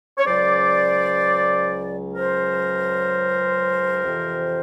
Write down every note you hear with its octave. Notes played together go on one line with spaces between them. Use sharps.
C#5
C#2 C#3 F#3 C5 D5
A#4 C5
F2 C3 E3